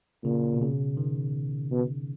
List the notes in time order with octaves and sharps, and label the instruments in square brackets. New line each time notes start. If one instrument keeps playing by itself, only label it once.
[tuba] A#2 [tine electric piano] C#3
[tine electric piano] B2
C#3
D#3
[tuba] B2